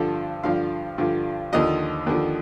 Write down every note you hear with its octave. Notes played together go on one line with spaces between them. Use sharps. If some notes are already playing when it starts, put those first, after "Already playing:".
Already playing: G2 D3 F3 A4
G2 D3 F3 F5
G2 D3 F3
D#2 D3 F3 D#5
D#2 D3 F3